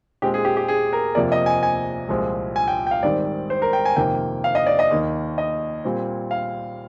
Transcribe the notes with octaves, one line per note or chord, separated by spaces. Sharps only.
A#2 G#3 C4 G4
G#4
G4
G4
G#4
A#4
F2 C3 F3 A#3 D5
D#5
G#5
G#5
C2 A#2 F3 G#3 C4
G#5
G5
G5
F5
G#2 D#3 G3 C4 D5
C5
A#4
G5
G#5
F2 C3 D#3 A#3 G5
F5
D#5
D5
D#5
D#2 D#3 A#3
D#5
A#2 G3 C4
F5